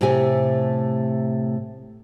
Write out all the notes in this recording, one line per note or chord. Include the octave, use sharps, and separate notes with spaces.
A2 C3 A3 G4 G#5